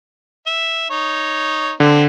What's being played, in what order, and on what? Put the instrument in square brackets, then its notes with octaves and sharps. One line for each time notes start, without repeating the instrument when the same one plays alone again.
[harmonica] E5
D#4 C#5
[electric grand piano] D3 [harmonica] C4